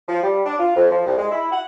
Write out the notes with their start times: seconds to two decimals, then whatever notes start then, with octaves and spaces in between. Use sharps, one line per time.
0.08 F3
0.23 G3
0.46 D4
0.59 F4
0.76 F2
0.90 F3
1.06 C2
1.17 G#3
1.31 E4
1.51 F#5